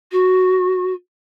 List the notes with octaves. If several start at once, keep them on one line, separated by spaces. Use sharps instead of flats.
F#4